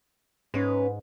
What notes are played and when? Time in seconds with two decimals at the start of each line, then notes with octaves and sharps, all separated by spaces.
0.54 G#2 C#4 B4